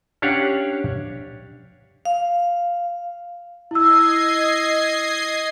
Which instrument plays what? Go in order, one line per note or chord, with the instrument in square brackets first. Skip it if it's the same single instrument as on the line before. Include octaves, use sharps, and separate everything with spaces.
[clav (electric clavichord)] C#4 D4 G4 C#5 F5 F#5
[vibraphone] F5
[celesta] E4 E6 [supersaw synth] D#5 G#6 C7